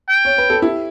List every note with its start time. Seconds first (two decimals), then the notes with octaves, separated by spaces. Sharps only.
0.10 G5
0.25 C#5
0.38 B4
0.50 A4
0.62 E4 G4